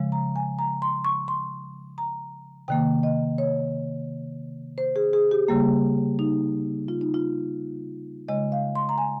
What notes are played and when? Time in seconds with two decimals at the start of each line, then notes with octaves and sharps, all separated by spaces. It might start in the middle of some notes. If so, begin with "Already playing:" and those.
Already playing: C#3 F3 G#3
0.12 A#5
0.36 G#5
0.59 A#5
0.82 C6
1.05 C#6
1.28 C6
1.98 A#5
2.68 C3 D#3 A#3 G5
3.03 D#5
3.38 C#5
4.78 C5
4.96 G#4
5.13 G#4
5.31 G4
5.48 C#3 G3 A#3
6.19 D#4
6.88 F4
7.01 D#4
7.14 F4
8.28 C#3 G#3 D#5
8.52 F5
8.75 C6
8.89 A#5
8.98 G#5